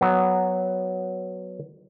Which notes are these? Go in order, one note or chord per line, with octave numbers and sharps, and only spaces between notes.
F#3 B3